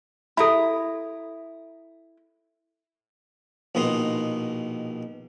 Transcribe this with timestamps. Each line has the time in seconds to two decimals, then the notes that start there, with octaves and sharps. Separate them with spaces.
0.37 E4 A4 A#5 B5
3.75 A#1 B2 D#3 D#4 D#5 C6